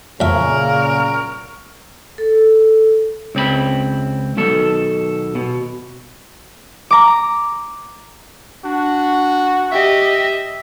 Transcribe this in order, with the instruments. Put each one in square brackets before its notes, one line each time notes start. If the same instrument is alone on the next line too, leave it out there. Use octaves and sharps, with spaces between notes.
[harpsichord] F2 E5 [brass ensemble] A#2 C#3 [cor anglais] F#3 [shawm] A#4
[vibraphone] A4
[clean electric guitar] C#2 C4 G#4 B5
B1 B2 D#3 A4
B2
[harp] A#5 D6
[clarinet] D4 [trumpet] F#4
[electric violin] G4 D#5 [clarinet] E5